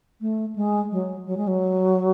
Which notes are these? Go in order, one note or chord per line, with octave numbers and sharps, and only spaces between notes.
A3
G#3
F#3
F#3
G#3
F#3